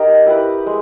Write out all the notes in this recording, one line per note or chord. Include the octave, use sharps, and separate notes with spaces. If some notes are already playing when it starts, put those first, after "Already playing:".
Already playing: D#4 G4 A#4 D#5
E4 G4 B4
G#3